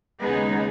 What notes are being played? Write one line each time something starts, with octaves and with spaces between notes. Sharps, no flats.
D#2 C#3 G#3 B3 D#4 G#4